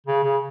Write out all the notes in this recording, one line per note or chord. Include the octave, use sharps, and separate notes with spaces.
C#3
C#3